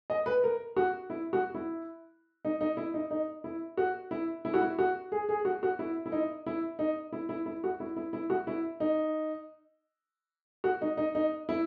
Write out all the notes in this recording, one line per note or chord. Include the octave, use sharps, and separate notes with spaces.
D#5
B4
A#4
F#4
E4
F#4
E4
D#4
D#4
E4
D#4
D#4
E4
F#4
E4
E4
F#4
E4
F#4
G#4
G#4
F#4
F#4
E4
E4
D#4
E4
D#4
E4
E4
E4
F#4
E4
E4
E4
F#4
E4
D#4
F#4
D#4
D#4
D#4
E4